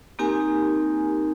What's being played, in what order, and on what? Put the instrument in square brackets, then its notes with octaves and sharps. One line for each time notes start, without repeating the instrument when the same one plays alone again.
[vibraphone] A#3 C4 D#4 G4 A#4 G#5